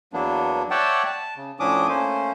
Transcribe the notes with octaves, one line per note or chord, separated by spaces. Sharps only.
E2 F#3 A#3 B3 D4
C#5 D5 E5 F#5 G5 A5
A5
C#3
A2 F3 C#4 D4 D6 D#6
A3 A#3 C#4 C5